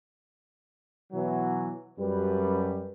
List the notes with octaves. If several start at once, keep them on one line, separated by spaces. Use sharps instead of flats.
B2 E3 F#3
F#2 G3 B4